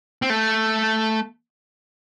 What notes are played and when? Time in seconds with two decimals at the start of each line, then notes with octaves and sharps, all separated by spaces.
0.22 C4
0.30 A3